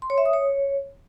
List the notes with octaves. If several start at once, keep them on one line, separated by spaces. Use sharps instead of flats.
C6
C#5
E5
D#6
C#5